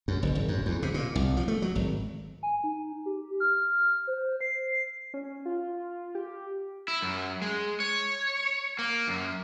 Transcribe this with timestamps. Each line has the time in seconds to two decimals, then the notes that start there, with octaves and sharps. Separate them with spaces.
0.08 F#2
0.23 F#1
0.35 G#1
0.48 F#2
0.66 E2
0.83 C3
0.94 A#2
1.15 C2
1.37 F3
1.48 A3
1.62 F#3
1.75 G#1
2.43 G#5
2.64 D#4
3.06 G4
3.40 F6
4.07 C5
4.41 C7
5.14 C#4
5.45 F4
6.15 G4
6.88 E4
7.02 F#2
7.42 G#3
7.80 C#5
8.79 A#3
9.08 F#2